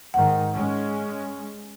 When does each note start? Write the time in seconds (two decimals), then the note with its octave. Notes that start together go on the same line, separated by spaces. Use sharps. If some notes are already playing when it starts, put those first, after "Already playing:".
0.14 G#2 D#3 F#5
0.55 G#3 C#4